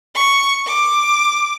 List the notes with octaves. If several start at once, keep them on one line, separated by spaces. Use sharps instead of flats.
C#6
D6